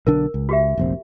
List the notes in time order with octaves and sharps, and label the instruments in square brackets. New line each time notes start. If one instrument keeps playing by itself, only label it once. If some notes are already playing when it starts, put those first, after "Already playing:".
[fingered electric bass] B1 D3 D4 [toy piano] A#4
[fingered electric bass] C#2
[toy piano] F#4 G4 E5
[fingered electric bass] F1 A#1 C4